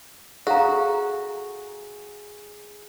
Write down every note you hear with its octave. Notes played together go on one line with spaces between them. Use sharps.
F#4 G#4 A4 F5 A#5